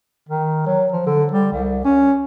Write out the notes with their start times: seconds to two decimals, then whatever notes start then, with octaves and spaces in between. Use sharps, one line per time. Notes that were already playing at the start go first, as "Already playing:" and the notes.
0.29 D#3
0.66 F#3
0.93 F3
1.06 D3
1.32 G3
1.52 C2
1.85 C#4